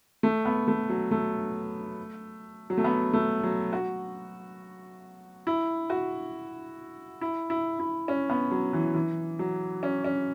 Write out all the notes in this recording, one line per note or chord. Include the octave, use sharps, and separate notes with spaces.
A3
B3
A3
F#3
A3
F#3
A3
B3
A3
F#3
F#4
E4
F#4
E4
E4
E4
C#4
B3
F#3
E3
E3
F#3
C#4
C#4